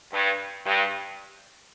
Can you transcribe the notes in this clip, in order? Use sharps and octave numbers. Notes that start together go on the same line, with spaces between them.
G2
G2